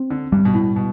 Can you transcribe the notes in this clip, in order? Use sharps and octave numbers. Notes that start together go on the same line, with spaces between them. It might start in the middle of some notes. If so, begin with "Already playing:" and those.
Already playing: C4
D3
G2 G3
B2
A2
B2